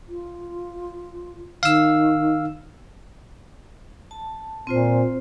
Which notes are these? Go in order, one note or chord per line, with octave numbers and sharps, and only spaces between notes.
F4
D#3 F5 E6
A5
A#2 C4 F4 C5